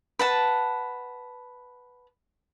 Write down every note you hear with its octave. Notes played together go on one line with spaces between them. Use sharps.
B4 F#5 A5